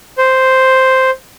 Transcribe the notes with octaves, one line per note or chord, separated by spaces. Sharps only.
C5